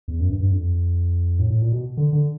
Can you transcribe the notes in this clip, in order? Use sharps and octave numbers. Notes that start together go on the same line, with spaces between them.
E2
F#2
G2
G2
F2
A2
A2
A#2
B2
D3
D3